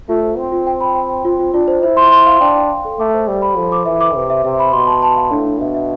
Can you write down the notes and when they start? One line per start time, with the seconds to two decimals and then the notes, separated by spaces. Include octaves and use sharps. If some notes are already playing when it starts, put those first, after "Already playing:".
0.09 A3 F4
0.23 C5
0.37 C4 F4
0.52 F4
0.67 G5
0.81 B5
0.95 G5
1.10 G5
1.25 C4 F4
1.39 F4
1.54 D4 F4
1.68 C5
1.83 E4 C5
1.97 C6
2.12 C6
2.26 F5
2.40 D4 G5
2.56 G5
2.70 G5
2.85 A4
2.99 A3 D6
3.14 C5
3.28 G3 C5
3.42 B5
3.57 F3 A4
3.72 D6
3.86 E3 E5
4.01 D6
4.15 C3 B4
4.30 E5
4.44 C3 E5
4.59 B5
4.73 B2 C6
4.87 A5
5.02 A5
5.16 F5
5.31 A2 D4
5.45 D4
5.60 B2 E5
5.75 E5